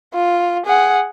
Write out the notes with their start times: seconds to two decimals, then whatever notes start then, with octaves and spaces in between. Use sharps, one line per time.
0.14 F4
0.65 G#4 F#5